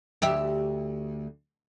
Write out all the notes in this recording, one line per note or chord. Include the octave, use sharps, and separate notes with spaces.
D2 G4 E5